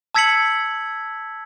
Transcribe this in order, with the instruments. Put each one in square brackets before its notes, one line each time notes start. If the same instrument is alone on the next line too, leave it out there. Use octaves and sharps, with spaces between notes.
[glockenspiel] A5 E6 G#6 B6 C#7 F#7